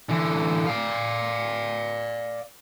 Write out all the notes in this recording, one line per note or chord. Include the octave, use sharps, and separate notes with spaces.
D3 E3
D5 F5